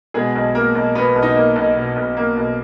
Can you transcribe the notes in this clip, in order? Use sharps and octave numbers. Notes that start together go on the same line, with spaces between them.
B2 G#3 G#4
B1
A#3 A#4
B1
B2 B3 B4
B1
D#4 D#5
A#3
B1
B2
B1
A#3
B1